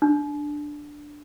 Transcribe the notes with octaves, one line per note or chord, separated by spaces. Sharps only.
D4